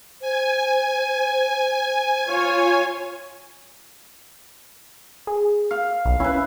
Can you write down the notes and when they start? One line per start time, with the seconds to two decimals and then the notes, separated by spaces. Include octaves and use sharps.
0.21 C5 G#5
2.27 F4 C#5
5.27 G#4
5.71 F5
6.05 B1
6.20 C#4 E4 B4